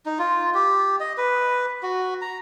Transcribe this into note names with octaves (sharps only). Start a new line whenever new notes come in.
D#4
F4
G4
D#5
B4
F#4
A#5